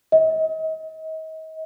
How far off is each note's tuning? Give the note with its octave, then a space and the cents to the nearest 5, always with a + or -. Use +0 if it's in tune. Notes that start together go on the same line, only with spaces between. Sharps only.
D#5 +35